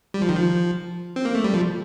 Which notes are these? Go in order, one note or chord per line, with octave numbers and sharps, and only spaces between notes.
G3
F3
D#3
F3
C4
A#3
A3
G3
F3